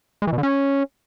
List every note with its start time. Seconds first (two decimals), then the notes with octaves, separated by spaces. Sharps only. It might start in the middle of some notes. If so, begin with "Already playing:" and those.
0.22 G#3
0.27 E3
0.33 B2
0.38 D3
0.43 C#4